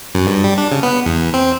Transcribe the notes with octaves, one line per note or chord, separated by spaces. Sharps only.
F#2
G2
G3
D4
C#3
B3
E2
C4